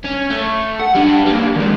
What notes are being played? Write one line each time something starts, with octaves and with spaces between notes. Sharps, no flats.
C#4
A3
F#5
G3 D4
G3 A#3
D#3 G#3